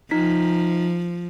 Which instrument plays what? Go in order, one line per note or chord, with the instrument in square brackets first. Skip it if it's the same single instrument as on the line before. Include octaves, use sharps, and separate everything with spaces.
[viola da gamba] F3 [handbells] D#4 B6